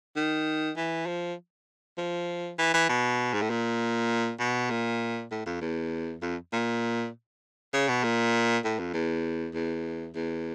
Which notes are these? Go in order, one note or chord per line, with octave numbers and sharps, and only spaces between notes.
D#3
E3
F3
F3
E3
E3
B2
G#2
A2
A#2
B2
A#2
A2
F2
E2
F2
A#2
C#3
B2
A#2
A2
F2
E2
E2
E2